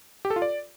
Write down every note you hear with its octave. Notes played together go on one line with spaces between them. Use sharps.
G4
A4
F4
D5